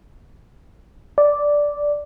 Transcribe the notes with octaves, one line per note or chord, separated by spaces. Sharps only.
D5